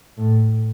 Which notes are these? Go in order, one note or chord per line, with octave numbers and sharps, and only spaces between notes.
A2